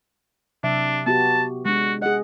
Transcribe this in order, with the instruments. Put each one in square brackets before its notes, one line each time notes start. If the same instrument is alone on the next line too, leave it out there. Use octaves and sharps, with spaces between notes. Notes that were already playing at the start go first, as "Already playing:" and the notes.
[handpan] C3 F#3 E5 [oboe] D4
[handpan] B3 F#4 G4 [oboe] A5
[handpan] G#3 D4 [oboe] F#4
[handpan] G#4 D#5 [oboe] F#5